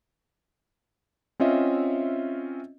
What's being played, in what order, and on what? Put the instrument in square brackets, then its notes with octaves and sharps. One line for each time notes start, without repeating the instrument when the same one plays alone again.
[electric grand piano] C4 C#4 F4 D#5 E5